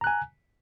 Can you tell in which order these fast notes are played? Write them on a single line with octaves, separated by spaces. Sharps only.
A#5 F#6 G#5